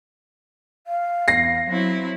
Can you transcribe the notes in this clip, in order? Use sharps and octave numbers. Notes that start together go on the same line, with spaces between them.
F5
E2 A#6 C7
F#3 C4 E4